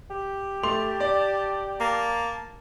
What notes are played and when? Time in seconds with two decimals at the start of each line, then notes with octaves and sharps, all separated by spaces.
0.10 G4
0.63 A3 A5 C6 F7
1.00 D5
1.80 A#3 A5